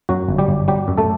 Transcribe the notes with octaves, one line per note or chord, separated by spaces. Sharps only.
F#2 F#3 F#4
G1
G3 G4
G1
F#3 G3 G4
F#2
A3 A4